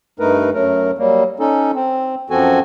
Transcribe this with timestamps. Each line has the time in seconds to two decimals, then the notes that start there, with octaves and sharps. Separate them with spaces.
0.19 G2 A3 D#4 A#4 B4
0.54 F#2 F#3 A3 A#4
0.98 F#3 G3 A#3
1.40 C#4 D#4 A4
1.75 C4
2.30 F#2 F3 C4 F#4 A4 G#5